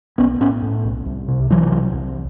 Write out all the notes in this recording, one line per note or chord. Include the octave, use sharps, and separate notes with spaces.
B1 B3 C#4
A2 B3 C#4
A2
B1
C2
C3
C3 E3 F#3
C2
C2